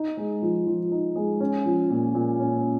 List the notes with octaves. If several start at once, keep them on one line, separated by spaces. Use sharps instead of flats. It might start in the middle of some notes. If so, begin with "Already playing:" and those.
Already playing: D#4
G#3
F3
F3
D#4
G#3
C#4
F3
A#2
A#2
C#4